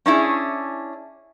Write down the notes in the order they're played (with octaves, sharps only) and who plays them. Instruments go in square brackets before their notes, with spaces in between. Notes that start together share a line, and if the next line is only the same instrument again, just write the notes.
[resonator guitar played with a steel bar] C#4 D4 E4 G#4